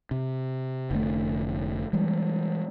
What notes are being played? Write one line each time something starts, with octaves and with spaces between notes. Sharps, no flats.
C3
F1 D3 A3
E3 G3 G#3